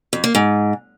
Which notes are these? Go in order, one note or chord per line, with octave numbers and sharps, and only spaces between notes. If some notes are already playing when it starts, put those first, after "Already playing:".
F2
A#3
G#2